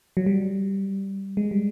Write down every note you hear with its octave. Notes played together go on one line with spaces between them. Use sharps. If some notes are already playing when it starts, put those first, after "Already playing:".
F#3
G3
G#3
G3